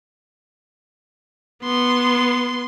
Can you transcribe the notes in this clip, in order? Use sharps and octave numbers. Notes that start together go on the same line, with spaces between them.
B3 C6